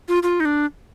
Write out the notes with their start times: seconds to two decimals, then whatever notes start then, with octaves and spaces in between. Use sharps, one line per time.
0.08 F4
0.23 F4
0.40 D#4
0.45 D4